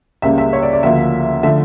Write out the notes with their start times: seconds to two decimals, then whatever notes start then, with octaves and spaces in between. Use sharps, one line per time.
0.22 C#2 C#3 G3 A#3 E5
0.38 E5
0.53 C#5
0.62 D5
0.73 D5
0.83 D2 C#3 F3 A#3 E5
1.43 D3 F3 A3 E5